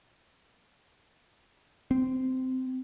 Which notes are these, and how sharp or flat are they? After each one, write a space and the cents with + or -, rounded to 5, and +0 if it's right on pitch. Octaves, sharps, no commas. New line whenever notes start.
C4 -15